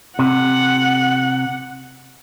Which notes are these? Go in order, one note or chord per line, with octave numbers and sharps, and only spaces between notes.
C3 F#5